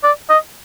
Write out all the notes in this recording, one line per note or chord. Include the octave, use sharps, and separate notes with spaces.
D5
D#5